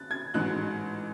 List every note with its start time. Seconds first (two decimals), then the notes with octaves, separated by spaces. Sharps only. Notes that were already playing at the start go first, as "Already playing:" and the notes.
Already playing: F#6 A6
0.11 G#6
0.34 A1 G#2 F#3 F#6